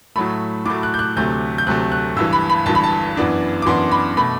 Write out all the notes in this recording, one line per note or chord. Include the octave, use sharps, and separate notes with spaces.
A2 F#3 A3 B5
A2 F#3 A3 D6
F#6
G6
F#6
D2 C3 F#3 A3 G6
G6
D2 C3 F#3 A3 F#6
F#6
G1 G2 E3 E6
B5
B5
G1 G2 E3 A5
B5
A5
F#2 E3 B3 D4
D6
F#2 E3 B3 D4 C6
B5
B2 A3 B5